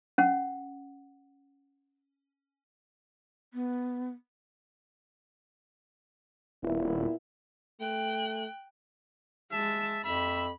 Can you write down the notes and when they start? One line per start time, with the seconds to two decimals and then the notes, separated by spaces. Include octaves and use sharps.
0.18 C#4 F#5
3.54 B3
6.63 D#1 A#2 B3 E4
7.80 A3 G5 F#6
9.52 G#3 E5 A5
10.05 F2 E5 B5